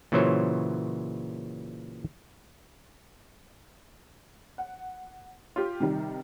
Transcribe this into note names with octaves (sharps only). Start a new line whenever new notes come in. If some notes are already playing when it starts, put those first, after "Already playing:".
A#2 C#3 E3 F#3 C5 C#5
F#5
F4 G4
C3 D#3 G3